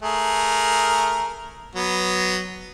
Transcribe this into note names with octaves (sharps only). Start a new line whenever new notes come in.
A3 G#4 A#4
F#3 B3